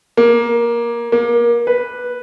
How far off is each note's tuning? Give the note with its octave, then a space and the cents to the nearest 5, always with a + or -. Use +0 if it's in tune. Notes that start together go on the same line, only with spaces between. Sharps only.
A#3 +15
A#3 +25
B4 -5